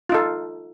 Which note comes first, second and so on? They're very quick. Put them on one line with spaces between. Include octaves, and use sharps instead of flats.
F4 D#4 A4